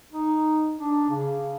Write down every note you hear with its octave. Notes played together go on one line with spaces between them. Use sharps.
D#4
D4
C#3